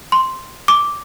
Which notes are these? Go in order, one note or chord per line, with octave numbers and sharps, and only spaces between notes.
C6
D6